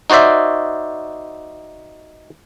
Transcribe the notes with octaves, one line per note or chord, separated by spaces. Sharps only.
D#4 F#4 C5 D5 E5